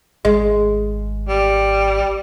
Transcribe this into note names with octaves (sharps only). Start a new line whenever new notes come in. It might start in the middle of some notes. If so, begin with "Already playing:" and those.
G#1 G#3
G3